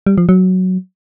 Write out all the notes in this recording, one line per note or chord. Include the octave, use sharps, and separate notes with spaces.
G3
F3
F#3